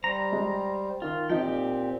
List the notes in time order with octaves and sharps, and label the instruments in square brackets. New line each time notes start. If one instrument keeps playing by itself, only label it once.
[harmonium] G3 C5 [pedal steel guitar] A#5
[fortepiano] G#3
[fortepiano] D#3 [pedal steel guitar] F4
[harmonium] A#2 C4 [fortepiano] F3 D#4 [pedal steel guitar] G4 G5